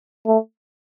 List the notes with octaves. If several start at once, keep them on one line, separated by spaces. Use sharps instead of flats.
A3